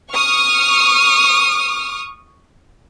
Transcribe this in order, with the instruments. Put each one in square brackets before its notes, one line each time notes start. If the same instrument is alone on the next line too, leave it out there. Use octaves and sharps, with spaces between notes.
[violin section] C#6 D#6 F6